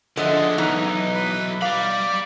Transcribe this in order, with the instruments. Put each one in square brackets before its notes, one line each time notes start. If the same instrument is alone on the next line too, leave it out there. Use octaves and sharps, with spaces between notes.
[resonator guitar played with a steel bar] D3 [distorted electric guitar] F3 G#3 [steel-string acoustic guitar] D#5 E5 F#5
[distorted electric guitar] B1 [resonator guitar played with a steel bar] E3 D#4
[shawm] B4
[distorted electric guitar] D5 B5 [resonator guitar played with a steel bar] F5 [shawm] D6